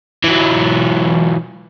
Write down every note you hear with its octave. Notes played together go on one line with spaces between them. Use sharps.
E3 F#3